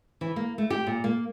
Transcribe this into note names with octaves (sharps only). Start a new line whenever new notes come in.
E3
A#3
A3
G4
A#2
A#3